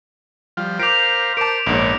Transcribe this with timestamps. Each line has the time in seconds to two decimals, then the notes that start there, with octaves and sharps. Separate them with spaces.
0.57 F3 G3 F4
0.79 A#4 C5 F5 D6 G6 B6 D7 F7
1.37 A#4 C5 A5 D6 D7
1.66 A#1 G#2 B3 A#4 C#5